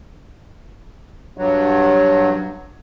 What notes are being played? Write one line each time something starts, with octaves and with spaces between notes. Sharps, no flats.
G2 F#3